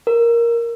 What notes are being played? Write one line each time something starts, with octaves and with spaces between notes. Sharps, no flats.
A#4